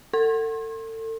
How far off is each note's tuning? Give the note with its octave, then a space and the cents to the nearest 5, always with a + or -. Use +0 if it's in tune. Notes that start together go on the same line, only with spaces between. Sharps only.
A4 +35 C6 +40